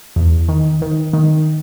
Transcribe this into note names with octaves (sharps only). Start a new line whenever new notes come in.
E2
D#3
D#3
D#3